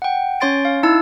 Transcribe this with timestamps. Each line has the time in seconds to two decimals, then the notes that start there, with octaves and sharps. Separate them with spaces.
0.02 F#5 G5
0.40 C#4 C#5 C6 A6 D7
0.65 F5
0.83 D#4 E4 A5 E6